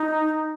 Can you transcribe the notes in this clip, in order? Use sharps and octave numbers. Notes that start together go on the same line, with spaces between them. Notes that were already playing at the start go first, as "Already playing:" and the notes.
Already playing: D#4